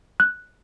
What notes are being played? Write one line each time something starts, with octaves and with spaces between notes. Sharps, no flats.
F#6